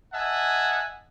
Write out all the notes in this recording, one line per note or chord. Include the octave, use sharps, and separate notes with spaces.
D#5 E5 F#5 G#5 A5